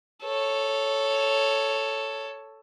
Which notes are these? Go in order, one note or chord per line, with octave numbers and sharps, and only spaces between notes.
A4 C#5